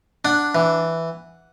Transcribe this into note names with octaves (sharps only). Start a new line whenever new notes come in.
D4 F#5
E3